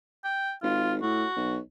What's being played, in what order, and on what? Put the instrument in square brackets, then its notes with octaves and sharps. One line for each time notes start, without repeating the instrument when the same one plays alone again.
[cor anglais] G5
[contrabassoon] G#1 [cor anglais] F4
[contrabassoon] A2 [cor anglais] F#4
[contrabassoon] B1